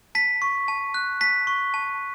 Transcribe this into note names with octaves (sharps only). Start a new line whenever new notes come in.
A5 B6
C#6
A5
F#6
A5 B6
C#6
A5